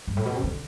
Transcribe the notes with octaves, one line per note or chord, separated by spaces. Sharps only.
G2
A2
B2
C3
D3